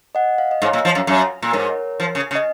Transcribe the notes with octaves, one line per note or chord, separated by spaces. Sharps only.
D#5 F#5
F5
D#5
G#2
C#5 F5
A#2
F3
F#2
F#2
A#2
G#2 A#4 C#5
F3
C#3
C#3
D#5